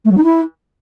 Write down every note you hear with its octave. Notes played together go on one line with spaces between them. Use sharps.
A3
F#3
D#4
E4